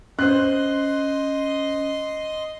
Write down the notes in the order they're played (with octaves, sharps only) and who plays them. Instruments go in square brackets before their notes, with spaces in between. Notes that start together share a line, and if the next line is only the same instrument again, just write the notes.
[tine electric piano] C#4 [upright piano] C5 F#6 [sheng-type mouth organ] D#5 C6